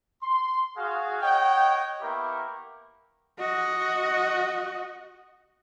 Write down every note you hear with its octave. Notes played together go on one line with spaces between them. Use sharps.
C6
F#4 G#4 F5
C#5 D#5 F#5 G5
A#3 B3 E4 G4 A#4 C#6
F#4 D#5